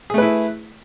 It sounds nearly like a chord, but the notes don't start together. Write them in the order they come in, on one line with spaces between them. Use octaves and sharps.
G#4 A3 B4 E4